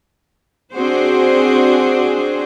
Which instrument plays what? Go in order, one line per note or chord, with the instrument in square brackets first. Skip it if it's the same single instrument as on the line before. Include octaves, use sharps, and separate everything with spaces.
[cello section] C4 D4 F#4 G#4 C5